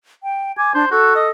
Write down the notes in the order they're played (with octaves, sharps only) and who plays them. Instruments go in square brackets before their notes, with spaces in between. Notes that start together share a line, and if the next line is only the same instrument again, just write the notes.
[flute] G5
[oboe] G#5 [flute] D6
[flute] D4 [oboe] C5
[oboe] F#4 [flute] A4
[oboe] D#5